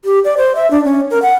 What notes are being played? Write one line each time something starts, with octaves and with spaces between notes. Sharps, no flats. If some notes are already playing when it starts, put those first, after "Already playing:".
G4
D5
C5
E5
D4
C#4
A#4
F#5